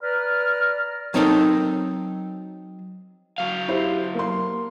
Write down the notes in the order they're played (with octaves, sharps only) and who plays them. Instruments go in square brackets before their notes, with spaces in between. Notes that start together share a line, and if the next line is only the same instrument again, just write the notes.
[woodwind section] B4 D5 A#5 F6
[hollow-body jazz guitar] F#3 C4 D#4 A4 A#4
[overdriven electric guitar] F#3 F5
[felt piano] E4 G4 C5
A#3 C6